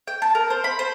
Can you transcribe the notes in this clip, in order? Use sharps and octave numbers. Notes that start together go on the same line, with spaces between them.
G5
A5
A#4
C5
B5
C5